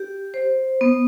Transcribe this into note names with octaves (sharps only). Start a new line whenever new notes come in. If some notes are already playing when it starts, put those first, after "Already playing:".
Already playing: G4
C5
B3